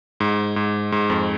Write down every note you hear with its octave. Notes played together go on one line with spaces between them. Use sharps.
G#2
G#2
G#2
F2